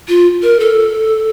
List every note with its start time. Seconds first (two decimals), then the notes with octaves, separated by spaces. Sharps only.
0.08 F4
0.42 A#4
0.60 A4